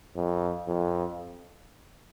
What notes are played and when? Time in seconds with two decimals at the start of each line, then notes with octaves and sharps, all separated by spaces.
0.16 F2
0.68 F2